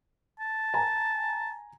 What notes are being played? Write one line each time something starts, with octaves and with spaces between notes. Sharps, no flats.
A5
G#5 A#5